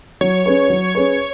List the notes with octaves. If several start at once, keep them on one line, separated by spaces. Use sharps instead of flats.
F#3 C#5
C#4 G#4 B4
F#3
C#4 G#4 B4